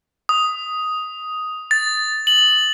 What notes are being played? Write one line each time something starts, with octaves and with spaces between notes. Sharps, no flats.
D#6
A6
F#7